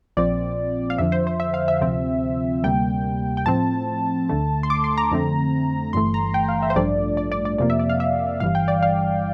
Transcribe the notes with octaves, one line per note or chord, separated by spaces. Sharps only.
A#1 A#2 F3 C4 D5
F5
F2 D3 F3 E5
C5
C5
E5
F5
E5
D2 C3 F3 C4
D2 C3 G3 A#3 G5
G5
A2 F3 C4 A5
D2 D3 A3
C6
D6
C6
A#5
F2 D3 A3 C4
G1 G2 E3 A3 C6
A#5
G5
F5
E5
C5
A1 G2 F3 A3 D4 D5
D5
D5
D5
F2 C3 F3 A#3 D5
E5
D5
F5
E5
G1 G2 E3 G3 F5
G5
D5
F5